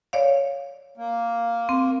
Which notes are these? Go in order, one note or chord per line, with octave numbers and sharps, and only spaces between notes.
C#5 D5 F5
A#3
C4